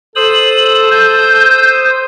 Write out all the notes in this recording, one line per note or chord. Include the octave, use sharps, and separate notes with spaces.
A4 C5 D#6 E6 F#7
G6